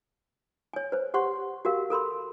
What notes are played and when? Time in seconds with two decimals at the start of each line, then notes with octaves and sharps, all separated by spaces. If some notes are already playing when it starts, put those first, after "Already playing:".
0.73 C#5 G#5
0.92 B4 C5
1.14 G4 C5 F#5 C6 C#6
1.65 F#4 G4 A#4 F5
1.90 A4 A#4 B5 C6